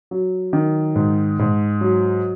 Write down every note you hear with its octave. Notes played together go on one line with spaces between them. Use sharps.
F#3
D#3
G#2
G#2
F#3